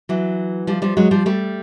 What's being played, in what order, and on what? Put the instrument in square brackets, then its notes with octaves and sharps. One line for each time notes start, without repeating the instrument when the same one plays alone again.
[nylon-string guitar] E3 F#3
F3 G3
F3 G3
F#3 G#3
F3 G3
G3 A3